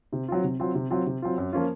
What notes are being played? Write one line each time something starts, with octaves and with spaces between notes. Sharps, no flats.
C3
F#3 C4 F4
C3
F#3 C4 F4
C3
F#3 C4 F4
C3
F#3 C4 F4
F#2
F3 A#3 C#4 F4